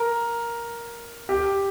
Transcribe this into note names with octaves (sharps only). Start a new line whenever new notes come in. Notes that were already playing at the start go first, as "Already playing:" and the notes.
Already playing: A#4
G4